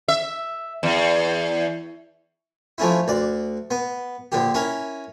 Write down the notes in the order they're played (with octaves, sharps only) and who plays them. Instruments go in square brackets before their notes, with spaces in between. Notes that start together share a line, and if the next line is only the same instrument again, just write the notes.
[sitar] E5
E2
[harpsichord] F3 A3 C#4 E4
D2 D5
B3
A#1 D3 G4
C#4 E4 A#4